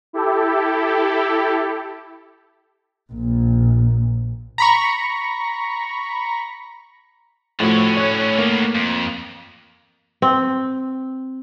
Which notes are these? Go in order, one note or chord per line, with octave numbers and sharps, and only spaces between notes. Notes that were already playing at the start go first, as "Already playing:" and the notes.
E4 G4 A4
A#1 A#2
A#5 B5 C#6
A2 D3 F3 C#4 F#4
C#5 F#6
D#3 A#3 B3 A#6
F2
C4